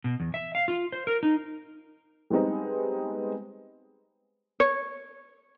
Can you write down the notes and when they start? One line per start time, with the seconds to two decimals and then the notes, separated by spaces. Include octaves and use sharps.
0.04 B2
0.20 E2
0.34 E5
0.55 F5
0.68 F4
0.92 C5
1.07 A#4
1.23 D#4
2.30 G3 G#3 B3 C4 D#4
4.60 C#5